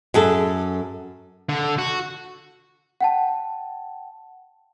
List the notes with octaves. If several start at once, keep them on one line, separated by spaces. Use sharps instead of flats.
F#2 G#4 A4
D3
F#4
F#5 G5 A5